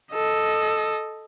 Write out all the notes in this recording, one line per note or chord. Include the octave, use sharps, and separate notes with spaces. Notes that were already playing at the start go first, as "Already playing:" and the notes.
A4 D#5